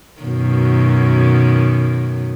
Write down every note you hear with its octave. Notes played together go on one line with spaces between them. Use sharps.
F#2 B2 D#3